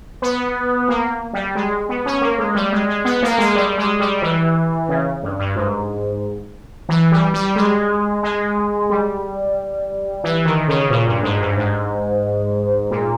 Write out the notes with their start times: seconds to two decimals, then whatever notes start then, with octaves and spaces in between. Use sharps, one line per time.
0.22 B3
0.88 A#3
1.33 G3
1.55 G#3
1.89 B3
2.06 C#4
2.21 A#3
2.38 G#3
2.55 G3
2.72 G#3
2.88 G#3
3.05 B3
3.23 A#3
3.38 G#3
3.55 G3
3.78 G#3
4.00 G3
4.22 E3
4.89 C#3
5.23 G2
5.39 G2
5.56 G#2
6.89 E3
7.12 G3
7.34 G3
7.56 G#3
8.23 G#3
8.90 G3
10.24 E3
10.45 D#3
10.68 C#3
10.90 A#2
11.07 G2
11.23 G#2
11.40 G2
11.57 G#2
12.91 A#2